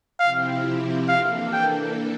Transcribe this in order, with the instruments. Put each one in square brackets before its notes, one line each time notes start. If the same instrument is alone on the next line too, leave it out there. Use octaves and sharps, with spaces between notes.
[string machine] C3 F3 C4 E4 G4 [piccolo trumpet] F5
[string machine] E3 A#3 D4 A4 [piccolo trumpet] F5
[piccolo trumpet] G5